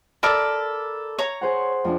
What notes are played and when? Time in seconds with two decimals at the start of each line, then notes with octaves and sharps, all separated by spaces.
0.23 A4 A#4 D5 B5
1.19 C#5 A#5
1.41 G#4 C5 F#5
1.84 F2 D4